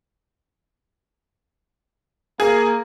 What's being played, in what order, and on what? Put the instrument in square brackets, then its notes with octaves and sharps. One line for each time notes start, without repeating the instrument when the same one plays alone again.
[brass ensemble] A#3 [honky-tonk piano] G#4